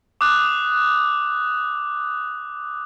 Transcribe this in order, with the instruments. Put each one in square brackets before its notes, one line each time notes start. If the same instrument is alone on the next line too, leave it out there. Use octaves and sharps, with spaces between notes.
[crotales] D6 D#6 F#6